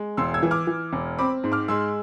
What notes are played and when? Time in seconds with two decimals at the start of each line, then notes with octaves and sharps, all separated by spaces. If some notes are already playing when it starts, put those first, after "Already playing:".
Already playing: G#3
0.17 E1 C6 E6
0.34 E6 G#6
0.43 E3
0.51 D6 F6
0.67 E3
0.93 E1
1.18 C4 B5 D6
1.44 G#2
1.52 D6 F6
1.68 G#3 C6 E6